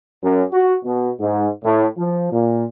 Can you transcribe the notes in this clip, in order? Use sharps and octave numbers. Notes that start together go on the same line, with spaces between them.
F#2
F#4
B2
G#2
A2
F3
A#2